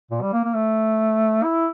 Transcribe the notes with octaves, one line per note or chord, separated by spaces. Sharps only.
A#2
G3
A#3
A#3
A3
E4